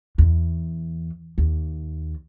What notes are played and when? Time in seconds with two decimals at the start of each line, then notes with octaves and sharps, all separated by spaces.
0.18 E2
1.38 D#2